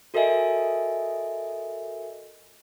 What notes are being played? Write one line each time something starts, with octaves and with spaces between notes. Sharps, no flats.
F#4 A4 A#4 D#5 E5 G#5